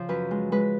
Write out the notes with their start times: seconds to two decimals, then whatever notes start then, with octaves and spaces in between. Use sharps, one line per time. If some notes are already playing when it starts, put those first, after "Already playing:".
Already playing: C#3 F3
0.09 F#2 B4
0.31 G#3
0.52 G#3 B4